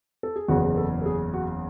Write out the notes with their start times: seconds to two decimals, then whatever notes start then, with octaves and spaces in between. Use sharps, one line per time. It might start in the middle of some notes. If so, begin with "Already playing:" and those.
0.23 A4
0.36 G#4
0.48 F#1 E2 C#3 F#4
0.65 G#4
0.77 A4
1.02 A4
1.06 G#4
1.34 F#4